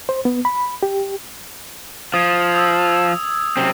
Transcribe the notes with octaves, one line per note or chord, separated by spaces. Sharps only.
C5
B3
B5
G4
F3 D#6 G#6
D#6 E6
F#2 C3 C4